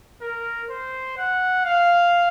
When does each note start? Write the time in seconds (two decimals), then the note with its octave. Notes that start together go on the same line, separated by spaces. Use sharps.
0.22 A#4
0.70 C5
1.17 F#5
1.65 F5